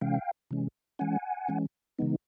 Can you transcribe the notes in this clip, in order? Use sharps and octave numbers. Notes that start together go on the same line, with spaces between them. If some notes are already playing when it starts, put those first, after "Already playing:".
C3 E3 G#3 C#4 F5 G5
C3 E3 G#3 C#4
E3 G#3 C#4 F#5 G#5
E3 G#3 C#4
C#3 E3 G#3 B3 D#4